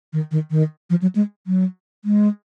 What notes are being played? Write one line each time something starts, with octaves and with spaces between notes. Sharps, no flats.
D#3
D#3
D#3
F3
F#3
G#3
F#3
G#3